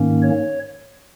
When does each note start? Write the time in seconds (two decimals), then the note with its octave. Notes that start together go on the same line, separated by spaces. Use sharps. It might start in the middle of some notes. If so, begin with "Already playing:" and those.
Already playing: G#2 D#3 A#3 C#4
0.22 C#5